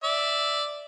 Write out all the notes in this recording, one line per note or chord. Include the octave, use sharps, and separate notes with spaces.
D5 E5